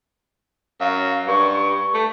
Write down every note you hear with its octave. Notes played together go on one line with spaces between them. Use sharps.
F#2 F5
G2 C#6
A3